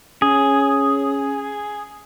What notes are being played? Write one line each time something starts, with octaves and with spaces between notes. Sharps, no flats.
C#4 G#4